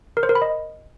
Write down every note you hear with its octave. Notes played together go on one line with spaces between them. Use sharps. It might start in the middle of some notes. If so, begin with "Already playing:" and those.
A#4
C5
A#4
B5
D#5